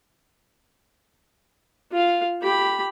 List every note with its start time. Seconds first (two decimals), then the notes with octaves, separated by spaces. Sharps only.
1.92 F4 F5
2.42 G4 B5